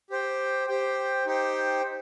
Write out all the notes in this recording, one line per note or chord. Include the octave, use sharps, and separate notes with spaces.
G4 C5 G5
G4 C5 G5
D#4 G4 C5 G5